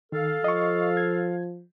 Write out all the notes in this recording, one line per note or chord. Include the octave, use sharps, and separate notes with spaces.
D#3 A4 F5
F3 D#5 C#6
G#6